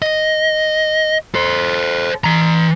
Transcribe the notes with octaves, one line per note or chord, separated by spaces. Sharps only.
D#5
A4 C5
E3 A#5